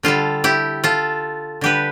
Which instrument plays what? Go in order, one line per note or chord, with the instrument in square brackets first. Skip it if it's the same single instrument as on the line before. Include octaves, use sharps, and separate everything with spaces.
[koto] D3 G3 F4 A4
E4 G4
F4 A4
D3 G3 G4 B4